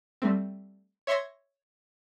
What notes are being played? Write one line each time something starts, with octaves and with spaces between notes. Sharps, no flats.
G3 A3 C4
C#5 E5 C6 C#6 G#6 A#6